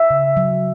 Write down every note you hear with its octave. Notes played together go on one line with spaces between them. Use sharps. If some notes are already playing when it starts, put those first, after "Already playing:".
Already playing: E5
C#3
F#3